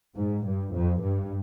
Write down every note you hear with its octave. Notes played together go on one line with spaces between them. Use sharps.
G#2
G2
F2
G2